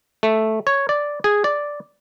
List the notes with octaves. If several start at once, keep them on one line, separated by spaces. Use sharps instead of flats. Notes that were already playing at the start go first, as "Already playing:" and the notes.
A3
C#5
D5
G#4
D5